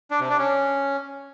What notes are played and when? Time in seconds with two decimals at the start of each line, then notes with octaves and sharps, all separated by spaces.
0.11 D4
0.20 C3
0.29 D4
0.39 C#4